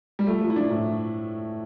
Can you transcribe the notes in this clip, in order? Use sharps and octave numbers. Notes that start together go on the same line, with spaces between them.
G3
F3 A3
F3
E4
F3 D4
A2